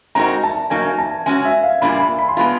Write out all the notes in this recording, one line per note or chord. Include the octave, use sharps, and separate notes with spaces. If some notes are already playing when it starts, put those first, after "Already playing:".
G#3 C4 D#4 F#4 A#4 A#5
A5
F#3 A#3 D#4 G#5
A5
G#3 C#4 F#4 G#5
E5
F5
A#2 G3 A#3 D4 F4 B5
B5
B5
C6
G#3 B3 D4 F4 B5